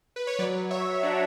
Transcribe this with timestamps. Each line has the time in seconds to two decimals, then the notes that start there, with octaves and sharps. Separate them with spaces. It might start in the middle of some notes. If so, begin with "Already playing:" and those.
0.16 B4
0.27 C#5
0.39 F#3 B4 D5
0.55 F#3
0.70 F#3 C#5 E5
0.86 F#3
1.03 F#3 D4 F#4